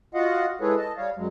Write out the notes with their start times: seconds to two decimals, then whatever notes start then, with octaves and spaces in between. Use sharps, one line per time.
0.14 F4 F#4 D#5 F5 F#5
0.61 G#3 E4 G#4 A4 B4 C#5
0.77 D#5 A5
0.97 G3 C#5 F5
1.16 F#2 F#3 G#3